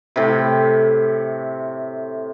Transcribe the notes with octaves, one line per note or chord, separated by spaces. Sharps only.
A2 C3